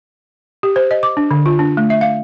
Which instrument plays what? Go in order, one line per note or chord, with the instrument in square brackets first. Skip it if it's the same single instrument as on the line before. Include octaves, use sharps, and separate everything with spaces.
[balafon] G4
C5
D#5
D6
D4
D3
F4
D4
A3
E5
F5